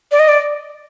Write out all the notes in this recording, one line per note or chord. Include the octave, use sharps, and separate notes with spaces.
D5
D#5
D5